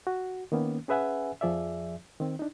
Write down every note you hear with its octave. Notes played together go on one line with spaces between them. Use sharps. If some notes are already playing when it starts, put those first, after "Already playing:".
F#4
D#3 A#3 B3 C#4
C#4 G#4 B4 E5 F#5 G#5
F2 F3 G#4 D5 E5
D#3 C4
D4 D#4